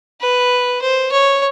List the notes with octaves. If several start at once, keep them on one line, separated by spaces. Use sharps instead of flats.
B4
C5
C#5